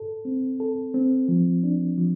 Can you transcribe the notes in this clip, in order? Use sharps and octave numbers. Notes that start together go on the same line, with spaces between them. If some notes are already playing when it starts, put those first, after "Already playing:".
Already playing: A4
C4
A4
C4
F3
D4
F3